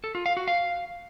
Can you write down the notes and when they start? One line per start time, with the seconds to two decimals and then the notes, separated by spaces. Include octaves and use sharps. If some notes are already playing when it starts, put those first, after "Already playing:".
0.04 A4
0.15 F4
0.26 F5
0.37 F#4
0.48 F5